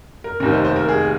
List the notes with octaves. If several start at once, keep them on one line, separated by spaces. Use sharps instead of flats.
A#4
F1 D#2 D#3 A#4
C5
C5
A#4
G#4